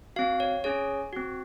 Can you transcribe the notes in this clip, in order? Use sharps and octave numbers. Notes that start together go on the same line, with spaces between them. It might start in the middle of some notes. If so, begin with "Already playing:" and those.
C4 F#4 F5
C#5
C#4 G#4 C#5
C4 F#4